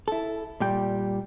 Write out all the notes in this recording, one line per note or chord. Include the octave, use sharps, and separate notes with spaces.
E4 A4
A#2 G3 G5